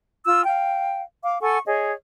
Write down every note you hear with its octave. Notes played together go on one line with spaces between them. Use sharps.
F4 E6
F5 G5
F5 D6
A4 F#5 G#5 C#6
G#4 C#5 D#5